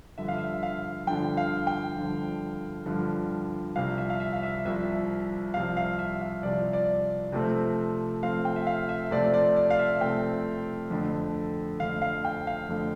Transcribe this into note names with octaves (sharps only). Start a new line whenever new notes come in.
G2 D3 F3 E5
F5
E5
F5
G2 D3 F3 G5
F5
G5
G2 D3 F3
G2 D3 F3
C2 C3 F3 F5
E5
F5
E5
F5
E5
C2 C3 F3 E5
C2 C3 F3 F5
F5
E5
F5
C2 C3 F3 D5
D5
C3 F3 A3 C4
C3 F3 A3 C4 F5
G5
E5
F5
E5
C3 F3 A3 C4 D5
D5
D5
F5
E5
C3 F3 A3 C4 G5
F2 D3 A3
F2 D3 A3 F5
F5
G5
F5
F2 D3 A3